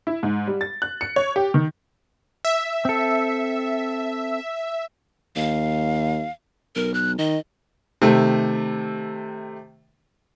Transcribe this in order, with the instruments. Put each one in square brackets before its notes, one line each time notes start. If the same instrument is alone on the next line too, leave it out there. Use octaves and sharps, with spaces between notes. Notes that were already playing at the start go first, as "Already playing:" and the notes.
[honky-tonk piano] E4
G#2
G3
A6
F#6
C#7
C#5
G4
D#3
[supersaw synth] E5
[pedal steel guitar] C4 A4
[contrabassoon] D#2 [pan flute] F5
[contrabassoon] B1 [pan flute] A#4
[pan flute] F#6
[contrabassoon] D#3 [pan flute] D#5
[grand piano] C3 D#3 A3